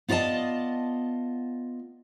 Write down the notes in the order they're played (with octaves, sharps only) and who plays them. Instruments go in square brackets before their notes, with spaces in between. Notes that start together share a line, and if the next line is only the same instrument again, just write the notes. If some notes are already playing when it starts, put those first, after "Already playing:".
[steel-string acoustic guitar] B3 F4 D5 D#5 A5